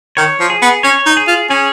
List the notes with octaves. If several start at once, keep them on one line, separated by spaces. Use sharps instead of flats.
D#3 C#5
F3
G#4
B3
C#4 C#5
D#4
G#4
F4
C#4 G#4